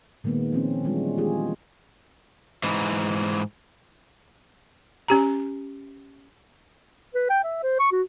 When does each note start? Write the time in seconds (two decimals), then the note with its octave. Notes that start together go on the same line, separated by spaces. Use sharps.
0.24 A#2 D#3 G#3 A#3 B3
0.52 F3 C4 C#4
0.84 E3 G3 G#3 C#4 D4 F4
1.17 D#3 E3 G#3 F4 G4 G#4
2.63 G#2 E3
5.08 C#4 G4 A#5
7.15 B4
7.30 G5
7.44 E5
7.63 C5
7.80 C#6
7.92 F#4